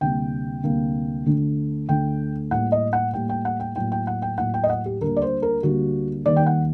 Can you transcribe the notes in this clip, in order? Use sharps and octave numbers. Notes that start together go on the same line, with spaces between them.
D2 C3 G3 A#3 G5
D2 C3 G3 A#3
D2 D3 A3
D2 D3 A3 G5
A2 G3 A#3 F#5
D#5
F#5
A2 G3 A#3 G5
G5
F#5
G5
A2 F#3 A#3 G5
G5
F#5
G5
A2 F#3 A#3 F#5
G5
D#5
F#5
G4
D2 D3 G3 A#3 A#4
D5
C5
A#4
D2 D3 G3 A#3 F#4
D#2 D#3 G3 A#3 D5
G5
F#5